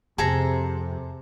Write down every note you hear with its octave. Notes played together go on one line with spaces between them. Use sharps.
F2 C3 G#4 A4 A#5